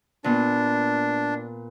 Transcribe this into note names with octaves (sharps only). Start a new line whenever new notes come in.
A#2 B3 D4